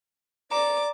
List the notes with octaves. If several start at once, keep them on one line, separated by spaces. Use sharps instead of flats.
D5 A#5 D6